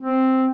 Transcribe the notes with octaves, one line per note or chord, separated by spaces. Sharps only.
C4